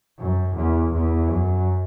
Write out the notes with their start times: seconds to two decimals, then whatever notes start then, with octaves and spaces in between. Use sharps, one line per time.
0.19 F#2
0.55 E2
0.92 E2
1.29 F#2